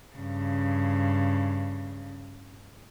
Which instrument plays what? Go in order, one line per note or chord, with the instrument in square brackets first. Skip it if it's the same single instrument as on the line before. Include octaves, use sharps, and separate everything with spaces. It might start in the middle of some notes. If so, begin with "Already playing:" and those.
[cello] G2 C#3